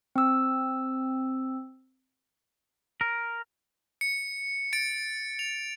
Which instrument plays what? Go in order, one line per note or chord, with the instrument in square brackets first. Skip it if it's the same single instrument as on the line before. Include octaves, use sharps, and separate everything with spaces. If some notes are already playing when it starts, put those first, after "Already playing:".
[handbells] C4 E6
[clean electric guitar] A#4
[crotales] C#7
A6 C#7 D7
F7